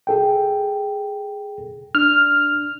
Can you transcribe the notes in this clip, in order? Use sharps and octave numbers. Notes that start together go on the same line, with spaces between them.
G#4 A4 G5
D4 F6